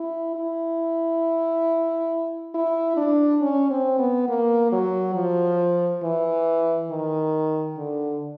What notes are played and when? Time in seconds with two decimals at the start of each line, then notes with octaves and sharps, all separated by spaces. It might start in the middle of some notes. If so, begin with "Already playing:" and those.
Already playing: E4
0.36 E4
2.54 E4
2.97 D4
3.41 C#4
3.71 C4
3.99 B3
4.28 A#3
4.72 F#3
5.15 F3
6.03 E3
6.91 D#3
7.78 D3